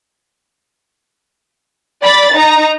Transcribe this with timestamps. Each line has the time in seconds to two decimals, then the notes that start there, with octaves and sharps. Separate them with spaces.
2.03 D5 B5 A6
2.35 D#4 A#5